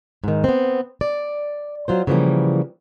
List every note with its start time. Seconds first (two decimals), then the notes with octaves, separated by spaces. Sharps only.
0.24 G#2 D#3
0.44 B3 C4
1.01 D5
1.88 F#3 F4 C5
2.07 C#3 E3 F3 G3 A#3